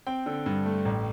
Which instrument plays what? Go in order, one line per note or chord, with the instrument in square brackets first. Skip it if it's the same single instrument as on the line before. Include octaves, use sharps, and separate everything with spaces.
[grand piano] C4 G5
D3
G2
A3
A1